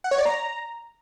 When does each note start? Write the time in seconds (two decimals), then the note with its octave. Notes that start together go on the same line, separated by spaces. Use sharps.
0.04 F#5
0.11 C#5
0.18 D5
0.26 A#5